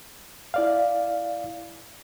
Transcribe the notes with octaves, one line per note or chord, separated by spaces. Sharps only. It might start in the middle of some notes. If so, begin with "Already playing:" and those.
E4 D5 F5